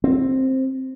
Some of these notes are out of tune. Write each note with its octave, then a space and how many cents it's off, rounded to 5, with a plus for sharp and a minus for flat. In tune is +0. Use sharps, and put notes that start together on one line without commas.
C4 +10